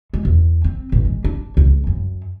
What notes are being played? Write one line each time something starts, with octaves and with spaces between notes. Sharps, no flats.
G#3
E2
C4
A1
G#3
D4
C#2
F#2